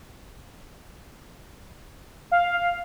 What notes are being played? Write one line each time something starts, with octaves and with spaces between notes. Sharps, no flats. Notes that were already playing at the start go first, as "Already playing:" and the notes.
F5